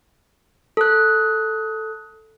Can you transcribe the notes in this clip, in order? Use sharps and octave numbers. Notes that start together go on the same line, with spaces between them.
A4 F#6